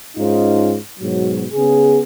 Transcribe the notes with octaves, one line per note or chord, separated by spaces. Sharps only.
G#2 C#4 D#4 F4
G#2 B2 F#3
C#3 B3 G#4